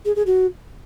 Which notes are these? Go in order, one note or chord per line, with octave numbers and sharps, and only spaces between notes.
G#4
G#4
F#4